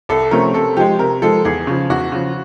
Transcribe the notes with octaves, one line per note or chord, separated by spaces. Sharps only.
C2 A4
C3 F3 A3 C#4 A#4
C3 A4
F3 G#3 G4
C3 A#4
F3 G#3 A4
E2 G#4
C#3 F3
E2 F#4
C#3 F3